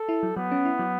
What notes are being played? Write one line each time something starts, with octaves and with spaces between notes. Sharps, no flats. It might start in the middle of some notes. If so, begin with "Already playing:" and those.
Already playing: A4
E4
F#3
F#3 B3
C#4
E4
F#3